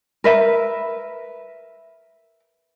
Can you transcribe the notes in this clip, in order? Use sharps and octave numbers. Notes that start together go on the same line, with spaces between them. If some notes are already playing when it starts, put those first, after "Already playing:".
A#4 B4 E5